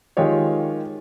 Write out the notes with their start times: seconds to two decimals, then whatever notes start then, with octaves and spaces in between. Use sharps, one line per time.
0.17 D#3 G#3 F4 G4 C#5